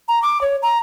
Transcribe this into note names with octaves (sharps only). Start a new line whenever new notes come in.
A#5
D6
C#5
A#5